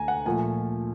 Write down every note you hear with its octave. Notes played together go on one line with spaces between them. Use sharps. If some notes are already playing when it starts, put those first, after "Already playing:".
Already playing: D2 A3 G#5 A#5
F#5
A#2 F3 A3 G#5